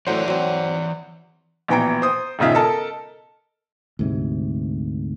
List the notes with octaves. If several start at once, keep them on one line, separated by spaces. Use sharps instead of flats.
A2 E3 F#3 C5 D5 F#5
F#3 C4
A#1 B2 E3 G5 A#5 D7
C5 D#6
E1 G#2 C#3 F4 E5
A4 A#4 D#5 A5
D2 G#2 C3